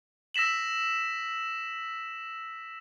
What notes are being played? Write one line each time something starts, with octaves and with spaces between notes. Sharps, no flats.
E6 A#6 B6 E7 F#7